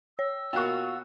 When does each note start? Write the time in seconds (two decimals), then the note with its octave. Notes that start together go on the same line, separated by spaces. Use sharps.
0.19 C#5 E6
0.53 B2 A#3 F4 F#4 G5 C#6 F#6